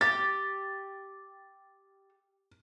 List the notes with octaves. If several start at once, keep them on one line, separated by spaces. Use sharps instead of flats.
G4 A6